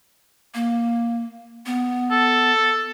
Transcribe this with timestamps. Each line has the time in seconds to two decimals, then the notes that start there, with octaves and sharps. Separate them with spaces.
0.54 A#3
1.66 B3
2.11 A4